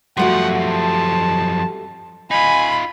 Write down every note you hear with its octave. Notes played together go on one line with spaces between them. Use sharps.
F#2 F3 G3 A3 F#4 F#5
A5
D#4 F4 G#5 B5